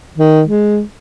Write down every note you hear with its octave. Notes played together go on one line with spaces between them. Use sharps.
D#3
G#3